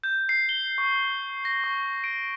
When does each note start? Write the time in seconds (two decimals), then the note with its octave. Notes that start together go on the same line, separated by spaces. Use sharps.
0.04 G6
0.29 C7
0.49 G7
0.78 C#6
1.45 A#6
1.64 C#6
2.04 D7